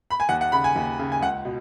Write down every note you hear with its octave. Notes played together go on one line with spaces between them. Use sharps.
B5
G#5
D#2 F#5
F#5
C#3 B5
G#5
D#2
C#3
G#5
C#2 F#5
B2